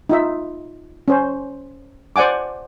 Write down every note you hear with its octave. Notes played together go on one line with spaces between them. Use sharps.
D#4 F4 E5
C#4 C5
C5 D5 F#5 G#5 D6